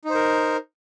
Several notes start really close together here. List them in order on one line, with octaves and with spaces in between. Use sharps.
D#4 C5 A#4